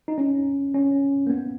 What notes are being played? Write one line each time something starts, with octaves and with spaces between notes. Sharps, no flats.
D#4
C#4
C#4
A#3
B3